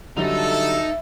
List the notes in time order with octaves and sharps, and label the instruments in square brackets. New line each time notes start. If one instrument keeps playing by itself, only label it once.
[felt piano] D3 F#3 G3 [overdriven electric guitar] D#4 [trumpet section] A4 [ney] E5